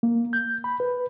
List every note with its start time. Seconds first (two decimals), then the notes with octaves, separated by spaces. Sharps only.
0.03 A#3
0.33 G6
0.64 B5
0.80 B4